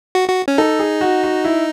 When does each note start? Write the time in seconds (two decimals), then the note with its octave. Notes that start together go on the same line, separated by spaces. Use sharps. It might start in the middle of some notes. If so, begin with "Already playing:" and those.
0.15 F#4
0.29 F#4
0.48 C#4
0.58 D#4 A4
0.79 G#4
1.01 F#4
1.23 F#4
1.44 E4